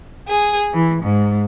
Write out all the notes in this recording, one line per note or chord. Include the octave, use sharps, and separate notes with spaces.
G#4
E3
G#2